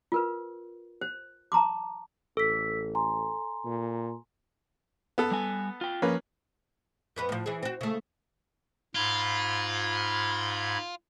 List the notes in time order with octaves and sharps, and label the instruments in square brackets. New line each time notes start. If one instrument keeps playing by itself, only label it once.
[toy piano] F4 A#4 B4
C5
A5 A#5 C6 D6
[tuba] A1 [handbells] A4 [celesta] E6 B6
[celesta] G#5 A#5 C6
[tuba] A#2
[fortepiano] B3 A4
[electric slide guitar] G3 G#5
F4 G5
[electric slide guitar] F3 [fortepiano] A#3 C#4 B4
[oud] F2 B3 B4
A2 F3
E3 G#4
C4 F#4
C#3 A3
[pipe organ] G#2 B5 G#6 [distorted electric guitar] F4